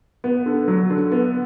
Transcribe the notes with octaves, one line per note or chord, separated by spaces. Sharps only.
B3
D3
F#3
D3
B3